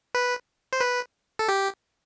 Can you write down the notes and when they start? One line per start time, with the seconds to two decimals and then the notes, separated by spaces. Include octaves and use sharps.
0.15 B4
0.73 C5
0.80 B4
1.39 A4
1.48 G4